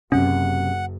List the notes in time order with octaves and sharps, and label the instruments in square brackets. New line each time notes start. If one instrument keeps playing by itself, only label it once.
[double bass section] F#1 [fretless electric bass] F#2 C3 [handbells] C#4 [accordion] F#5